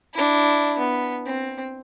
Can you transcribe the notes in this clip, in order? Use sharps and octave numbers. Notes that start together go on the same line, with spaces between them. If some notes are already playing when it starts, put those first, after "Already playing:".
D4 E4
B3
C4